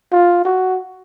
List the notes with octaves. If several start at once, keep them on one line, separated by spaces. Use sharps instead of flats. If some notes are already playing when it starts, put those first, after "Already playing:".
F4
F#4